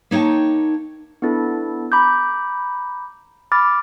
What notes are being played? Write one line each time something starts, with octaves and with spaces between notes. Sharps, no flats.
A#3 D#4 C#5 G5 A5
B3 D4 E4 A4
A#5 B5 D6 G6
B5 D6 F6 A6